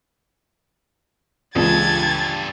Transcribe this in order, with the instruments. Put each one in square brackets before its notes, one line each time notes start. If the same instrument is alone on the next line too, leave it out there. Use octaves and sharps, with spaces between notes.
[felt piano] C#2 [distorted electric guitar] G2 A4 [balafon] E3 A#3 F4 [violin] G#6 A6